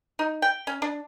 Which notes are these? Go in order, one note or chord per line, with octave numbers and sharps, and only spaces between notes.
D#4
G5
C#4
D4